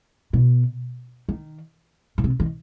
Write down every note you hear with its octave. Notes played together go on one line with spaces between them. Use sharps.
B2
D#3
B2
C3
D#3